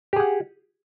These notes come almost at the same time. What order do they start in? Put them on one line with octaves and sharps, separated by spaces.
G4 G#4 F#5